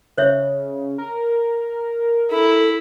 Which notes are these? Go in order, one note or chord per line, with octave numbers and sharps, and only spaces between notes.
C#3 C5 C#5 E5
A#4
E4 A4